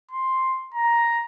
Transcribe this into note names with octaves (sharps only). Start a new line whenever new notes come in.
C6
A#5